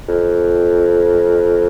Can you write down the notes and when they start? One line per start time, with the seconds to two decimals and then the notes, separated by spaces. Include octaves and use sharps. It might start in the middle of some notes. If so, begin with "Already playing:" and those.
0.08 F2